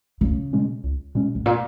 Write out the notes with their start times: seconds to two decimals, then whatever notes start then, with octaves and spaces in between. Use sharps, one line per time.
0.21 C#2 C#3
0.53 B2 G#3 C#4
0.84 C#2
1.15 B2 G#3 C#4
1.35 G#2
1.46 A#2